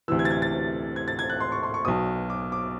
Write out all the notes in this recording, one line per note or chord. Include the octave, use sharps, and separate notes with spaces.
D2 C3 E3 E6
G#6
A6
G#6
A6
G#6
A6
G#6
F#6
C6
C#6
C6
C#6
B1 B2 D#6
D6
D6